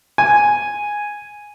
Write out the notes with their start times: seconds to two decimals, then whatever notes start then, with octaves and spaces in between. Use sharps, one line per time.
0.18 G#5